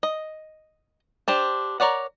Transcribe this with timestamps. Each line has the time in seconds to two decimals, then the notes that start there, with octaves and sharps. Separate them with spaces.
0.03 D#5
1.28 D4 G4 C5
1.80 A#4 C#5 D5 F#5